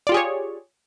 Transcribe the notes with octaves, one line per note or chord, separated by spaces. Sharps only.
F4 G4 G#4 C#5 D5